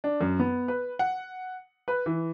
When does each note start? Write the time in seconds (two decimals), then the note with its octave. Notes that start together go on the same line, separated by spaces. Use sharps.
0.04 D4
0.20 F#2
0.39 B3
0.68 B4
0.99 F#5
1.88 B4
2.06 E3